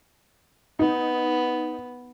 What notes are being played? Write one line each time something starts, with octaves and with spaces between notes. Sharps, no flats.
B3 D#4